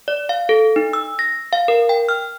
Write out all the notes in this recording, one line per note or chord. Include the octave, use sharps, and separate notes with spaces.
D5
F5
A4
D#4
E6
A#6
F5
A#4
G5
F6